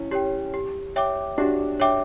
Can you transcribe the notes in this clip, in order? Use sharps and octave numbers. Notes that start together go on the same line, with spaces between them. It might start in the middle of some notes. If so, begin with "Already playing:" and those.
Already playing: C#4 E4
G4 C#5 G5
G4
C#5 E5 G5 D6
D4 F#4 G4
C#5 E5 G5 D6